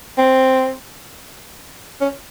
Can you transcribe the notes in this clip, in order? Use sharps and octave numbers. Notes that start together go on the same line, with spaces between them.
C4
C#4